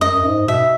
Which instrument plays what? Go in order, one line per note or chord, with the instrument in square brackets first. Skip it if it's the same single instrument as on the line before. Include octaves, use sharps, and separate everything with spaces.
[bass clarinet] F#2 [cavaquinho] D#5
[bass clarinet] F#2
G#2
[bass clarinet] B2 [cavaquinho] E5